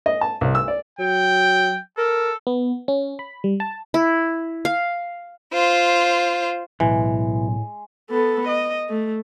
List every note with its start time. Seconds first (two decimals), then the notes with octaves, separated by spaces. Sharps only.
0.06 D#5
0.21 A5
0.41 C2
0.55 E6
0.68 D5
0.99 F#3 G5
1.97 A4 A#4
2.47 B3
2.88 C#4
3.19 B5
3.44 G3
3.60 A5
3.94 E4
4.65 F5
5.54 F4 C5
6.80 B1 A2 E3 G#3
8.10 B3 A4
8.48 D#5
8.89 A3